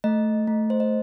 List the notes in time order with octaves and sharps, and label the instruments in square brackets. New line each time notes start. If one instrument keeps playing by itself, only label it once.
[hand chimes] A3 D#5
A3
C5
D#5